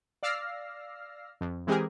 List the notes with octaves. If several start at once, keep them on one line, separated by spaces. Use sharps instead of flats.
D5 F5 E6 F6 A#6 C7
F2
E3 G#3 C4 G4 G#4 A#4